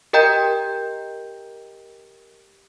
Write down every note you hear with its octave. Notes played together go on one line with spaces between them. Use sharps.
G4 A#4 D#5 G5 A#5 G6